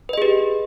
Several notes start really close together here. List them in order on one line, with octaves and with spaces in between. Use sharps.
B4 D#5 G#4 G4